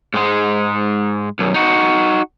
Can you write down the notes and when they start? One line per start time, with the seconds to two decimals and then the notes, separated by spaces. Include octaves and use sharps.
0.14 G#2 G#3
1.39 B1 F#2
1.54 D#4 F#4